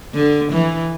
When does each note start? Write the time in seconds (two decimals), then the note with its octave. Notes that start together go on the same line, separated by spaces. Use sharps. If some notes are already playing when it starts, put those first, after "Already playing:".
0.14 D3
0.52 E3